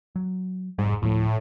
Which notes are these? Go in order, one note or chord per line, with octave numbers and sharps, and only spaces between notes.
F#3
F1 G#2 G3
D2 A2 F3 A3